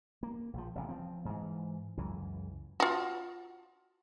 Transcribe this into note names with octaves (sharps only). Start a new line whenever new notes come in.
A#3
A#1 F3
A1 C3
F3 C4
G#2 E3
C#2 F#2 E3
F4 F#4